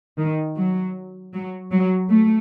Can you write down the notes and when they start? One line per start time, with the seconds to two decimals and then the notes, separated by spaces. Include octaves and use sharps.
0.18 D#3
0.56 F#3
1.34 F#3
1.71 F#3
2.10 A3